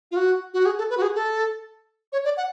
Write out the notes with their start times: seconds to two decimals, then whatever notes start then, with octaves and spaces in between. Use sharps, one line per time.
0.11 F4
0.16 F#4
0.54 F#4
0.66 G#4
0.78 A4
0.90 B4
0.97 F#4
1.02 G#4
1.15 A4
2.13 C#5
2.25 D5
2.37 F#5